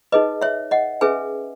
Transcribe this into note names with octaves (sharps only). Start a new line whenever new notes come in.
D#4 G#4 B4 D#5
C#5 E5
D#5 F#5
C#4 G#4 B4 E5 G#5